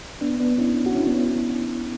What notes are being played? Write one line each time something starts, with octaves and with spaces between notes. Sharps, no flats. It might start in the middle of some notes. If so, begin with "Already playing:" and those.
B3 D4
B3 D4
C#4 E4
F#4
C#4 E4
B3 D4